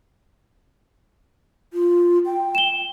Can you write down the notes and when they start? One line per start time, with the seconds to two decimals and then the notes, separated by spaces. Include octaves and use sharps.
1.73 F4
2.26 G5
2.55 E7 G7